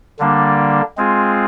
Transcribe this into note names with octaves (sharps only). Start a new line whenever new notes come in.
D3 G3 A#3 D4
G#3 C4 F4 G#4